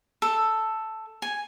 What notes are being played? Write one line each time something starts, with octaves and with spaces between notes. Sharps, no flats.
A4
G#5